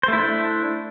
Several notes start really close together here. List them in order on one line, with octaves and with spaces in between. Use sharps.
C5 A3 E4 D4